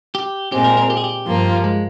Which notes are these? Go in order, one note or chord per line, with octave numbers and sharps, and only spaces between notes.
G4
A#2 G#3 C4 G4
A#4
A#4
G4
G#4
G4
G2 F3 A#3 F4
G#3